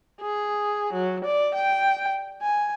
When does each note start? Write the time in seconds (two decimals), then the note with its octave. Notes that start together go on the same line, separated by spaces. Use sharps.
0.21 G#4
0.93 F#3
1.24 D5
1.54 G5
2.42 G#5